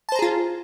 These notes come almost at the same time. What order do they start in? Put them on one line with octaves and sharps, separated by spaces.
A5 C5 A#5 G#4 F4